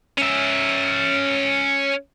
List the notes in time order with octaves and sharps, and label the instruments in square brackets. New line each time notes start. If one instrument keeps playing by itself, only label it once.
[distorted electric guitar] C#4 E5